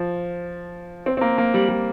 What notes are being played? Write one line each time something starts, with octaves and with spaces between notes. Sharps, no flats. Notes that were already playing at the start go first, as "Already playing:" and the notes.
Already playing: F3
C4
C4
A#3
A#3
G3
G3